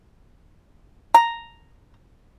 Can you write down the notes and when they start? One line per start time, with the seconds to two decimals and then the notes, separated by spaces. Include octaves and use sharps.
1.14 A#5